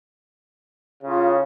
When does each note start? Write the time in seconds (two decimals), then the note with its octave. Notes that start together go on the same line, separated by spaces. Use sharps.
1.04 A2 C#3 F4